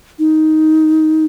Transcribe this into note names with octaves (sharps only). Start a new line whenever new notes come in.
D#4